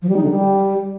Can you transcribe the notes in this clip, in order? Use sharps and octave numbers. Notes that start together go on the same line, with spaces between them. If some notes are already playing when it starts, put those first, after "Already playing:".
F3
G3
D#4
D3
G3